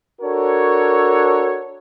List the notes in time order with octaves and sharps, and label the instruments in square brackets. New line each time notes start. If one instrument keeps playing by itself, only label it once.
[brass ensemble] D4 F#4 A4 A#4 C#5